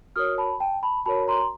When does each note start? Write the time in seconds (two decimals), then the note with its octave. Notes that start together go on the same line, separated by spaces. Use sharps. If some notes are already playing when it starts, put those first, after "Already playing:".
0.16 F#4 A#4 C#5 D#6 F6
0.38 A5 B5
0.60 G5 A5
0.83 A5 B5
1.06 F#4 A#4 C#5 A5 B5
1.28 A#5 C6